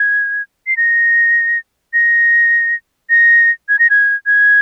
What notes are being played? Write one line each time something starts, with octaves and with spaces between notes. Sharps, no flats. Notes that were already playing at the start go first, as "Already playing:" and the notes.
Already playing: G#6
C7
A#6
A#6
A#6
G#6
A#6
G#6
G#6